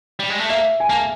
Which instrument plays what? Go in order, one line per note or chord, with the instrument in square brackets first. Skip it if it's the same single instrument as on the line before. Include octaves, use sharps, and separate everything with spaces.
[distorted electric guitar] G3
G#3
A3
[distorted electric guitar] A#3 [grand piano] E5
[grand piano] G#5
[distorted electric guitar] A#3 [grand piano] A5